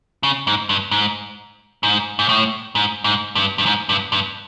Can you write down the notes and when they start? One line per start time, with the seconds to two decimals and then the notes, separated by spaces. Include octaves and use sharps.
0.23 C#3
0.47 G#2
0.69 G2
0.91 G#2
1.83 G#2
2.19 G#2
2.29 A2
2.75 G#2
3.04 G#2
3.35 G2
3.58 G2
3.66 G#2
3.89 G2
4.12 G2